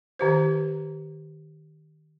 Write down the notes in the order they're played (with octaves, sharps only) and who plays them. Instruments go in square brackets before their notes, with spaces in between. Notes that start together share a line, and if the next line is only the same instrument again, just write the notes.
[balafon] D#3 G4 C5